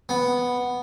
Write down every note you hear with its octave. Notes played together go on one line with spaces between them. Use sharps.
B3